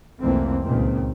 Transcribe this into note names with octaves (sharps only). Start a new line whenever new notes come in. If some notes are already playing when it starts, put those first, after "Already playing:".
C2 F2 E3 A3 A#3 C4
C#2 A#2 D#3 C4